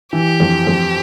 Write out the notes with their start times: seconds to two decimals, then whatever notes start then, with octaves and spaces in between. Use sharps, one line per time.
0.13 E3 G4
0.40 F2
0.67 F2